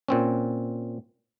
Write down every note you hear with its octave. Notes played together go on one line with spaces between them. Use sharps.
A#2 C4 C#4